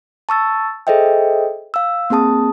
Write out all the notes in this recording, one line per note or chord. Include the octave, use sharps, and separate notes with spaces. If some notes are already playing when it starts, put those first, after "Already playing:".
A5 C#6 E6 A6
G#4 A4 C5 D#5 E5 G5
F5 E6
A#3 C4 G#4 A5 D#6